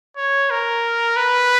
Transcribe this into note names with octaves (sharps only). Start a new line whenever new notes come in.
C#5
A#4
B4